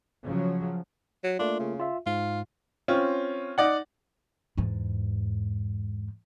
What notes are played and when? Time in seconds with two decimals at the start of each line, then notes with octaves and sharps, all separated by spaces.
0.23 C#3 F3 F#3
1.24 F#3
1.39 A3 A#3 D4 F4
1.60 C#3
1.79 F4 E5
2.06 G#2 F4
2.88 C4 C#4 F4
3.58 D#4 D5 F#5
4.57 E2 G#2